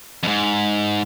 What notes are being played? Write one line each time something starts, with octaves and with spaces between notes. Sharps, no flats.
F2 G#2